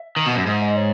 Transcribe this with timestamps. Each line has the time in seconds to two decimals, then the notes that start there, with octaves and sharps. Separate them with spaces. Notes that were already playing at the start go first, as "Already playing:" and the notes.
Already playing: E5
0.16 D#3
0.26 B2
0.36 F#2
0.47 G#2 E5
0.62 D#5
0.76 C#5